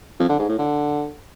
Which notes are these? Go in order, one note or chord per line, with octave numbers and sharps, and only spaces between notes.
F2
D3
G#2
A2
D3